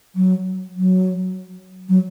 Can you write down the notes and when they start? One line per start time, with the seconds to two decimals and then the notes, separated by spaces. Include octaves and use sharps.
0.15 F#3
0.77 F#3
1.89 F#3